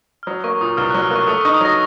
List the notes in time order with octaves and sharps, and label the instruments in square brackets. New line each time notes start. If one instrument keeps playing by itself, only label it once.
[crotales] F6
[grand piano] F#3 [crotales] D#6
[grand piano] A#3 [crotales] C#6
[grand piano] A#2 [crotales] D#6
[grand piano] C2 [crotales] F6
[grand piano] F#3 [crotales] F#6
[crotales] F6
[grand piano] A#3 [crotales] C#6
[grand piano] A3 [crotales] D#6
[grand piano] D#4 [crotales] C#6
[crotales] D#6
[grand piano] F#3 [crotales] A#6